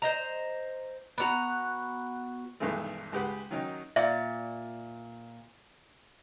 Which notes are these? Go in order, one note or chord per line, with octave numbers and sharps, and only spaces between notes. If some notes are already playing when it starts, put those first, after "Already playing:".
C5 D#5 A#5
B3 D4 F#4 A#5
B1 G2 D#3 E3 G#3 A3
C#2 G#3 G4 B4 F#5
D#3 F#3 C#4 D#4 G5
A#2 D5 E5